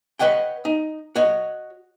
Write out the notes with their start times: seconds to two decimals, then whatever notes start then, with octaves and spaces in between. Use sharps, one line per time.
0.19 B4 C#5 D#5 F#5 G5
0.65 D#4
1.15 F#4 C#5 D#5